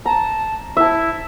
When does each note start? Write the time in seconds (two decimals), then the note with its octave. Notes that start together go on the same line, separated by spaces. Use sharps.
0.06 A5 A#5
0.77 E4 E5 A5